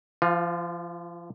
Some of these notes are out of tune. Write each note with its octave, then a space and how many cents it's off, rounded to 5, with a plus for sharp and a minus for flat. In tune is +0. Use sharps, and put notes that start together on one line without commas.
F3 -35 F4 +15